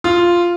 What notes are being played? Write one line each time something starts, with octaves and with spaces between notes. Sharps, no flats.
F4